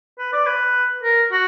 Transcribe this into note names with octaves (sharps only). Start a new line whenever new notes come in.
B4
D5
B4
A#4
F#4